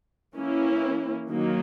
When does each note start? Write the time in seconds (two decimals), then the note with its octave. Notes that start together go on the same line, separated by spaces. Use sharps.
0.36 E3 A#3 C#4 E4
1.30 D#3 F#3 A#3